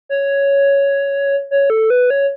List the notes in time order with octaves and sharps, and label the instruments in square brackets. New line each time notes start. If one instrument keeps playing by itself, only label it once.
[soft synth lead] C#5
C#5
A4
B4
C#5